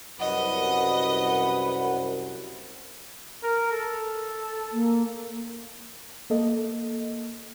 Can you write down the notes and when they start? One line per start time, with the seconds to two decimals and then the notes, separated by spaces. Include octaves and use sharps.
0.20 C2 F#2 B4 D#5 F#5
3.43 A#4
3.72 A4
4.72 A#3
6.30 A#3 A4 D#5